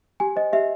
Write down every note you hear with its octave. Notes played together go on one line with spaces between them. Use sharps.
G4 G#5
C5 D#5
G4 E5